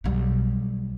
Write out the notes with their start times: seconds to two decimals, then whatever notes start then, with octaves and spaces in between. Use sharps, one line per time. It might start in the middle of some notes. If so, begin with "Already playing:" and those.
0.04 B1 G3